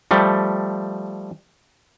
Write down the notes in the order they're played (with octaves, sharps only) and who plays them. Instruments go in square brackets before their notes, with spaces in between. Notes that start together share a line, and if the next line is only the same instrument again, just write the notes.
[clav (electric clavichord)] F3 G3 A3